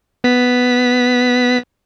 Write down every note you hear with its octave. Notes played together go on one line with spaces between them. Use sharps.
B3 B6